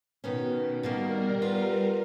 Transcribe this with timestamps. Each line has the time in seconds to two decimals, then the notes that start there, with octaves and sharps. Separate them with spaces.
0.24 B2 D#3 B3 C#4
0.83 B2 D#3 G3 A#3 A#4
1.42 B3 F4